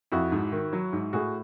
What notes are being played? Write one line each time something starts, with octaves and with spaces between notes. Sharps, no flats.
F2 E4 F#4
G#2
D#3
F#3
G#2
A2 F#4 G#4